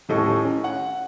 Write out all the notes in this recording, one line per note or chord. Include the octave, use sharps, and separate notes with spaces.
D#1 A2 A4 D#5 C#6
C#4
F#5